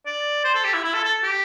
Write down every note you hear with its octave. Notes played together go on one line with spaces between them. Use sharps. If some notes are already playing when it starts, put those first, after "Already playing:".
D5
C5
A4
G4
E4
E4
A4
A4
G4